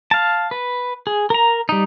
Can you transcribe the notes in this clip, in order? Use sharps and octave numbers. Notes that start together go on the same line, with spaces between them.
F5 A5
B4
G#4
A#4 A#5
G3 D#4